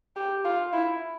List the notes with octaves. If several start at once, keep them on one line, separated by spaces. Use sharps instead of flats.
G4
F4
E4